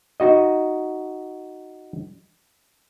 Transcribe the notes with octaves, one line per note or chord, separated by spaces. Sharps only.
D#4 F#4 D#5